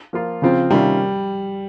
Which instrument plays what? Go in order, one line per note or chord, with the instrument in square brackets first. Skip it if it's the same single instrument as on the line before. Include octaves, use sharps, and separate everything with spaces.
[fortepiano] F3 A#3 F4
C#3 F3 C4 F4
[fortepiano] C3 D#3 A#3 C#4 F4 [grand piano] G3